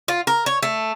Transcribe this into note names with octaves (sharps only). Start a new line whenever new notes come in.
F4
A#4
C#5
A3